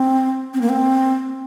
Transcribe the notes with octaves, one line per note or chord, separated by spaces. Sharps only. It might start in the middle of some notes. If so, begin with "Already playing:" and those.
Already playing: C4
C4
A#3
C4